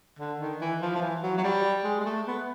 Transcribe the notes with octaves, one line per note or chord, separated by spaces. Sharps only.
D3
D#3
E3
F3
F3
E3
F#3
F#3
G3
G#3
G#3
A3
B3